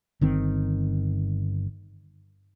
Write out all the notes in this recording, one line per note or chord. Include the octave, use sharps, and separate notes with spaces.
G1 D#3 C4